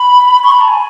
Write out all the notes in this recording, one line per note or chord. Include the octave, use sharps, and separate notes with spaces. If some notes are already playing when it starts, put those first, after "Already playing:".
Already playing: B5
C#6
B5
A5
G#5